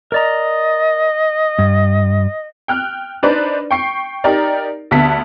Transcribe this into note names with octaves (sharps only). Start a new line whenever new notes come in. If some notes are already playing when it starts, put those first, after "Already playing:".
A#4 D5 D#5 A#5
G2
G5 F6 F#6
D4 D#4 B4 C5 D5
G5 C#6 C7
D#4 G4 A#4 D5
D2 D3 B3 A5 B6